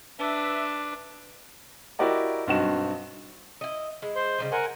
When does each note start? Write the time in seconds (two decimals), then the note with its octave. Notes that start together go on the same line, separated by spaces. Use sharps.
0.19 D4 B4 E5
1.99 E4 F#4 G4 A#4 D5 D#5
2.47 B1 G2 C4 F#4 D#5 E7
3.61 E4 D#5
4.02 G#3 E4
4.16 C5 C6
4.38 C#3 G3 D#4
4.52 A#4 C5 F#5 G#5